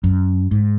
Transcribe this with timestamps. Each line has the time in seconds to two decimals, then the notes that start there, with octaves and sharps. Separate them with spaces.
0.04 F#2
0.51 G#2